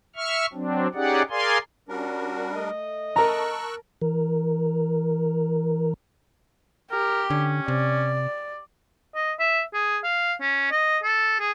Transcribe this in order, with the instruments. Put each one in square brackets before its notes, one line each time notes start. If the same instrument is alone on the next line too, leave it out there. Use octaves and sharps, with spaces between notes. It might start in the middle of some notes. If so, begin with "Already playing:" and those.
[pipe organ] E5 C#6 F6
F#3 C4 D4
C#4 D#4 G4 G#4 D5 F#5
G#4 A#4 D5 F5 G#5 C6
[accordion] G3 D4 A#4 [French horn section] C#4 F#4
[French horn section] A3 D#5
[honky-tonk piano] A#4 A5 [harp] A#5 [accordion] C#6 E6 F#6
[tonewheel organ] E3 A#4
[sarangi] G4 [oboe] A#4
[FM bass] D3 [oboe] C#4
[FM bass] C3 [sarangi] D5
[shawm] D#5
E5
G#4
F5
C#4
D#5
A4
G#4